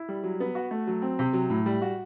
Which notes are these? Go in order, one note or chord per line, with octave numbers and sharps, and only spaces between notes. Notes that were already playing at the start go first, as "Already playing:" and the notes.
Already playing: E4
G3
F#3
B3
F#4
A3
F#3
C4
C3
F#3
A2
G3
F#4